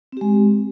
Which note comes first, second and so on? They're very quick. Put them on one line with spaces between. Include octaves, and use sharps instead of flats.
C4 G4 G#3